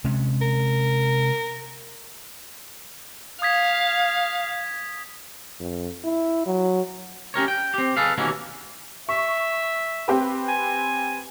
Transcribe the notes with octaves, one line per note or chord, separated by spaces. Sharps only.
C3 G#3 C#4
A#4
F5 D#6 G#6 B6
F2
E4
F#3
C#4 G4 A#4 C#5
G5
C4 G4
G#4 A4 B4 F5
D#2 B2 D3 E3 A#3 C#4
E5 C#6
C4 G4 B4
G#5